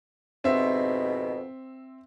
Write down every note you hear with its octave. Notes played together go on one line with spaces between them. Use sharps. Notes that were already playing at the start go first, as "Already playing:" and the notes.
F2 G#2 B2 C4 E5